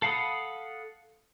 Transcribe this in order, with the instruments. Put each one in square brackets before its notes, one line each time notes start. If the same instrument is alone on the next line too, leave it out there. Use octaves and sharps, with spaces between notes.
[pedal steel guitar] A4 F5 F#5 B5 D#6